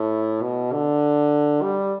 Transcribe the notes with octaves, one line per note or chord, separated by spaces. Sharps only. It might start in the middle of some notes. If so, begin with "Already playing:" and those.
Already playing: A2
B2
D3
G3